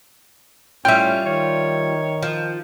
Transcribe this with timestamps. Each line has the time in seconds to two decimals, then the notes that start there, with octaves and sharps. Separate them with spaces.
0.85 A2 G3 C#4 F4 E5 G5
1.26 D#3 C#5
2.22 F3